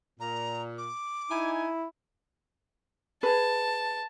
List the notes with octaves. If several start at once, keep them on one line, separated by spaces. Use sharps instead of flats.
A#2 A#5
D6
D#4 E4 G#5
G#4 B4 A5